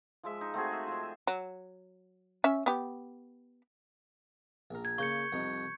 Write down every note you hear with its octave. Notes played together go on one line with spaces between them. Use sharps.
F3 G#3 E5
D#4
A3 C4 F#4 G#4
E5
F3 D#5
E5
F#3
C#4 E5
B3 G4
A#1 A#4
G#6
C#3 A#3 C#6 G6 C#7
C2 F2 D#4